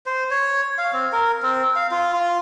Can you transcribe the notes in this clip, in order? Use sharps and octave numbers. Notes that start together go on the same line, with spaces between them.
C5
C#5
F5
C4
A#4
C4
F5
F4
F4